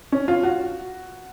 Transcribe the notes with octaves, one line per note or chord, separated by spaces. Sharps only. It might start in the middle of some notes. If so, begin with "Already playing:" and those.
C#4
F4
F#4